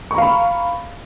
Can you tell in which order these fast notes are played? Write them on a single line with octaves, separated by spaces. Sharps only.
C#6 A#5 F5 B5